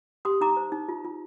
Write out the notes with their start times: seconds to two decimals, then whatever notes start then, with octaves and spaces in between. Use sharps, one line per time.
0.25 G4 C6 D#6
0.41 D#4 A#5 D6
0.57 C5
0.72 D#4
0.89 F4
1.05 F4